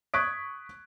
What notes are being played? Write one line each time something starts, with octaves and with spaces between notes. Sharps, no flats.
C#6 D#6 F#6 G#6 B6 D7